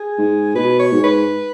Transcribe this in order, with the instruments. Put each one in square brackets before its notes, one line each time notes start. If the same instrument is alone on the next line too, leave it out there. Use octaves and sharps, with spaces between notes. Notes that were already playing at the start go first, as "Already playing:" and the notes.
Already playing: [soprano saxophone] G#4
[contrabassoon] G#2
[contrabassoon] B2 [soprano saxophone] B4
[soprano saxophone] C#5
[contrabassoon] G#2
[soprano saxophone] B4